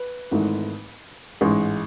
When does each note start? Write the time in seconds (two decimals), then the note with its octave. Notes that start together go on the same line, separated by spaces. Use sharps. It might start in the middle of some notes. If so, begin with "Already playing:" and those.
Already playing: B4
0.31 G#1 G#2 E3 A3
1.41 A1 G#2 G#3